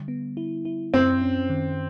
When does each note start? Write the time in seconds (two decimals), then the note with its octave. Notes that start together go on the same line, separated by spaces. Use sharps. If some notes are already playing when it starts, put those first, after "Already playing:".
Already playing: D3 G3
0.08 B3
0.37 E4
0.65 E4
0.94 F#2 C4
1.22 C#4
1.50 D#3